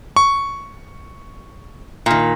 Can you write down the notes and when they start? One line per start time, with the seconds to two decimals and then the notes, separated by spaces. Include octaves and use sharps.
0.16 C#6
2.06 A#2 D#3